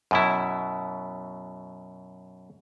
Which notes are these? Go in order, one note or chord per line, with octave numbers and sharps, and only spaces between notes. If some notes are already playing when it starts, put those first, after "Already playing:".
F#2 B2 E4